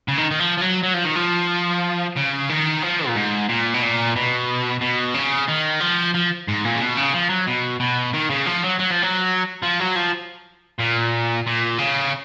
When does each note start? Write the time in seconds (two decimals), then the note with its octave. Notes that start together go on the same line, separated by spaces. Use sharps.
0.08 C#3
0.17 D#3
0.31 D#3
0.39 F3
0.57 F3
0.61 F#3
0.83 F#3
0.94 F3
1.05 D#3
1.15 F3
2.17 C#3
2.50 D#3
2.83 F3
3.07 A#2
3.15 G#2
3.49 A#2
3.74 B2
3.82 A#2
4.16 B2
4.81 B2
5.14 C#3
5.48 D#3
5.81 F3
6.15 F3
6.48 G#2
6.65 A#2
6.75 C#3
6.81 B2
6.97 C#3
7.14 F3
7.30 F#3
7.47 B2
7.80 B2
8.14 D#3
8.30 C#3
8.47 F3
8.64 F#3
8.80 F#3
8.91 F3
9.03 F#3
9.62 F3
9.80 F#3
9.96 F3
10.79 A#2
11.46 A#2
11.78 C#3